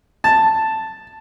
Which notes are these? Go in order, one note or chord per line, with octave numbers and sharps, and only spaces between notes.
A5